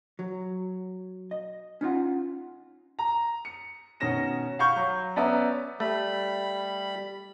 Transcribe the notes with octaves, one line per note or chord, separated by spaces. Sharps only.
F#3
D#5
C#4 D#4 F4 F#5
A#5
C#7
B2 D#3 C#4 A#6 E7
F5 F#5 B5 C#6 G6
F#3
B3 C#4 D5 E5 A#5
G3 A3 B5